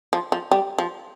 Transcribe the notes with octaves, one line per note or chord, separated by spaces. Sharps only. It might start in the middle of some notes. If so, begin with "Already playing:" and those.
F3
F3
G3
F3